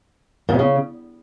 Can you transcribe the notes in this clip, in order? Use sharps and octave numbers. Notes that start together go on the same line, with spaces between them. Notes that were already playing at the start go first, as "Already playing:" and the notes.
A#2
C3
C#3